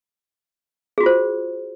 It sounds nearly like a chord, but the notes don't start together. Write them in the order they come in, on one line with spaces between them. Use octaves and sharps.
G#4 F#4 F4 C5